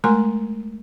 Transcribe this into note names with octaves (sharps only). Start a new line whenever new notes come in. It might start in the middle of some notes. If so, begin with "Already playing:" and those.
G#3 A3 A#4 G#5 A#5 C6